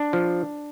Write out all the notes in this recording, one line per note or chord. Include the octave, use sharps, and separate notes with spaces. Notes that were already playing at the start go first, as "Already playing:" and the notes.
Already playing: D4
F3